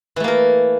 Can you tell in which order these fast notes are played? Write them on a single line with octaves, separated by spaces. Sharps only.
E3 A3 A#3 A#4